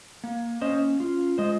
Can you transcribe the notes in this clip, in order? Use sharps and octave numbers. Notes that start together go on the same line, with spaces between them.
A#3
C#4 C5 D#5
F4
G#3 C5 D#5